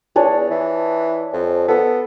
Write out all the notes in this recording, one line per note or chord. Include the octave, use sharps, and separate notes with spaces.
E2 D4 G#4 C#5
E3
F2
B3 A4 D6